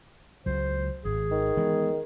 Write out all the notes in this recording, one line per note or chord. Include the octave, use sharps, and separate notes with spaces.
C#2 F#3 C5
G#1 G#4
D#3
E3 G#3 B3